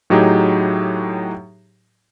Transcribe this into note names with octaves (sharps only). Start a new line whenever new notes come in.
A2 F#3 D#4 G4 G#4